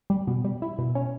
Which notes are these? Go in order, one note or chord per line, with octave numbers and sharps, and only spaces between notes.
G3
B2
G3
E4
B2
C#4